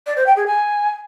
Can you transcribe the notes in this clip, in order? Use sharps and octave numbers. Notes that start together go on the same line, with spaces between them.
D5
C5
G5
G#4
G#5